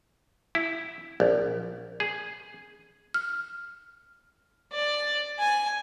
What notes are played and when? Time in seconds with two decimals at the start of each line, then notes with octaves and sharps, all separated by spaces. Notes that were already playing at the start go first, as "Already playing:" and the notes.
0.55 E4
1.20 A#1
2.00 G#4
3.14 F6
4.72 D5
5.39 G#5